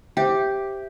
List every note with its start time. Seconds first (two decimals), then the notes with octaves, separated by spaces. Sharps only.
0.17 G4 C5 E5 G5